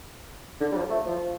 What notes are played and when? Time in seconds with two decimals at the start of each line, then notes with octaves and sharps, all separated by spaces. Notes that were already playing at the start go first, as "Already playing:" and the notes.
0.60 D3
0.72 G3
0.76 F3
0.90 A3
1.06 F3